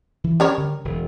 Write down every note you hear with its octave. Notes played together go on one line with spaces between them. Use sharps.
E3
G3 C#4 A#4 C#5
D3
E1